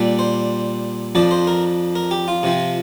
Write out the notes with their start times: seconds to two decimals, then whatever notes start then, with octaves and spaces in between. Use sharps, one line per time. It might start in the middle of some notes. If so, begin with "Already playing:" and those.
Already playing: A#2 G3 D4
0.19 C5
1.15 F2 F3 D4 D5
1.31 C5
1.47 A#4
1.96 A#4
2.11 G4
2.28 F4
2.43 C3 F3 C4